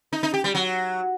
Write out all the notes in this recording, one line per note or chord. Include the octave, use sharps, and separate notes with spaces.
D#4
D#4
G4
G3
F#3